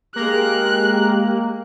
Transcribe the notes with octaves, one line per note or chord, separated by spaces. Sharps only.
G#3 A#3 G4 A#4 F#6